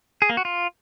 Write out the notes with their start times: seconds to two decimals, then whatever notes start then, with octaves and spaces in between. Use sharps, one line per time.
0.22 G#4
0.30 A#3
0.37 F#4
0.45 F4